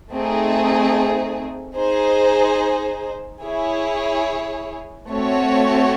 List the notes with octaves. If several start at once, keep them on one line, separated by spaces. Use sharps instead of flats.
A3 C4 D#4 G#4
D#4 G#4 C5
E4 G#4 C#5
A3 C4 F#4 C#5